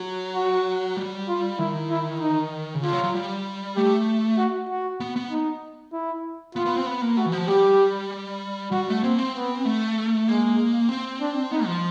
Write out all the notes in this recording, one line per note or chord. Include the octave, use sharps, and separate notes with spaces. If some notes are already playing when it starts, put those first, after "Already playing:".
Already playing: F#3
F#4
G3
F4
D#3 E4
E4
D#4
C#3
D3 F4
F#3
F#3
G3
A3 G4
F#4
F#4
B3
B3
D#4
E4
B3 F4
B3
C4
B3
A#3
A3 F#4
E3
F3
G3 G4
G3 F#4
A3
A#3 C4
C4
B3
A3
G#3 A#3
C4
D4
B3 D#4
F3